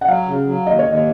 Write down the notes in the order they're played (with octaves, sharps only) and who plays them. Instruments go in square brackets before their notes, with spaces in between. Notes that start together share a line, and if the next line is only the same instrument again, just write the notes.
[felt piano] F#5
[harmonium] F#3 [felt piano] F5
[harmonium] C#3
F#3
[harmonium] D#2 [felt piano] D#5
[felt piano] C#5
[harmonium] D#2
[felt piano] D#5